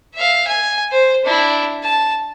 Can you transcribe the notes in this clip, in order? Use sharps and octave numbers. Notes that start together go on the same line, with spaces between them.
E5 F5
G#5
C5
D4 E4
A5